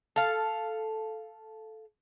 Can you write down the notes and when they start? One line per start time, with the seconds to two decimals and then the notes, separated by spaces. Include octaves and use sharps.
0.16 A4 F5